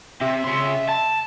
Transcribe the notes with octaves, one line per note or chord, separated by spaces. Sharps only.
C3 E5
C#3 C6
A5